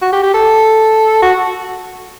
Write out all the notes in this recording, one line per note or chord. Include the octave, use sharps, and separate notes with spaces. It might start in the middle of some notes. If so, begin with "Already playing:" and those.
F#4
G4
G4
A4
F#4